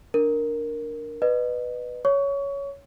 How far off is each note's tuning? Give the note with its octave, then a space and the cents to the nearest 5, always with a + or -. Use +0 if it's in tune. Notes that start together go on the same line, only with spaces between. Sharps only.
D4 +0 A#4 +0
B4 +0 D#5 -35
C#5 +10 C#6 +25